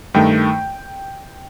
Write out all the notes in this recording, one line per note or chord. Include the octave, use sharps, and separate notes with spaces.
G2 D#3 A3 G5